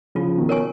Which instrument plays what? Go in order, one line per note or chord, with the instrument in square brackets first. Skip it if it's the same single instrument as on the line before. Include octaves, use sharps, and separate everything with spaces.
[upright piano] C#3 F3 [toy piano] F4
[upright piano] B2 D#3
[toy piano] A#4 C#5 G#5 C#6